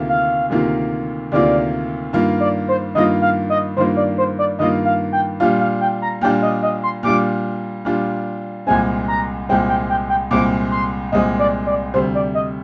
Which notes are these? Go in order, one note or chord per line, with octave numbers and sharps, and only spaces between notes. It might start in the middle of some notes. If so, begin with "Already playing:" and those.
Already playing: D2 C3 D#3 A#3 F4
F5
D2 C3 D#3 A#3 F4
D2 C3 D#3 A#3 F4 D5
G2 D#3 A#3 F4
D5
C5
G2 D#3 A#3 F4 D#5
F5
D#5
G2 D#3 A#3 F4 C5
D5
C5
D5
G2 D#3 A#3 F4 D#5
F5
G5
A#2 G3 D4 F4 F5
F5
G5
A#5
A#2 G3 D4 F4 G5
D#5
D#5
C6
A#2 G3 D4 F4 D6
A#2 G3 D4 F4
C2 A#2 G#3 C4 G#5
A#5
C2 A#2 G#3 C4 G5
G5
G5
G5
C2 A#2 G#3 C4 D6
C6
C2 A#2 G#3 C4 D#5
D5
D5
D2 C3 G3 C5
D5
D#5